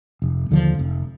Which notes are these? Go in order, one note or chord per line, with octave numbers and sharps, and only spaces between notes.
F1
D#2 D3 F3
F1